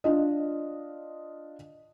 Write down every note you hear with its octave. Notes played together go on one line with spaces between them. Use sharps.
D4 F4 D#5